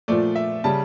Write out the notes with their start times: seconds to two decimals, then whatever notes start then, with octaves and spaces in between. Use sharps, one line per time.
0.08 A#2 F3 A3 D5
0.36 E5
0.64 C#3 G3 A5